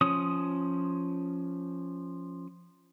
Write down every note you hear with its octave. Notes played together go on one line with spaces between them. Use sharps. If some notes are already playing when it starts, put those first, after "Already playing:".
F3 C#4 D#6